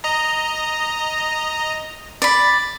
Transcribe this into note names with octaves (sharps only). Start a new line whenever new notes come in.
D#5 A#5
D5 B5